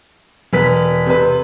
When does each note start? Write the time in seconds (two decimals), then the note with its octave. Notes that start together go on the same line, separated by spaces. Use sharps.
0.53 E1 B4 B6
1.06 C3 B4